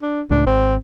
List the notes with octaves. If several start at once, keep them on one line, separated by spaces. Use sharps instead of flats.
D4
C#2 A2 D4
G#1 C4